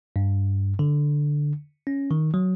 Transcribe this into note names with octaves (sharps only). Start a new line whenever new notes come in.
G2
D3
C#4
D#3
F#3